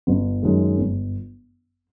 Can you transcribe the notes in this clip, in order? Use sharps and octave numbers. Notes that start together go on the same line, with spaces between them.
G1
F#2 D#3 G#3
G1